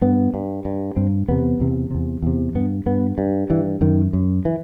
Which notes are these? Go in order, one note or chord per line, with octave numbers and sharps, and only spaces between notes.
G2 B3
G2
G2
G2 C4
E2 C3 B3
E2 C3
E2 C3
E2 C3
G2 B3
G2 B3
G2
G2 E3
F#2 D#3
F#2
E3